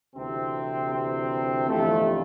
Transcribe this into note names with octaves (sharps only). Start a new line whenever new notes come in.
D2 C3 E3 C4
C4
G1 F2 C3 E3 A3